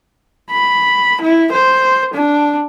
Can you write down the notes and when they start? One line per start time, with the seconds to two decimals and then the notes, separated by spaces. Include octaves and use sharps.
0.51 B5
1.21 E4
1.52 C5
2.14 D4